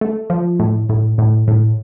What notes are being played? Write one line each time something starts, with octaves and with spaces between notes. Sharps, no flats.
A3
F3
A2
A2
A2
A2